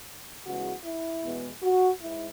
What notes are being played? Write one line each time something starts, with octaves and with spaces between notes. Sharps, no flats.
E2 C#3 E3 G#3 F#4
E4
E2 B2 G#3 B3
F#4
G#2 E4